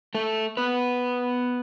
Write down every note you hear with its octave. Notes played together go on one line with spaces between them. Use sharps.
A3 A4
B3 B4